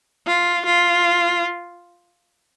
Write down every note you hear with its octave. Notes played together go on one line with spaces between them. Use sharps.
F4
F4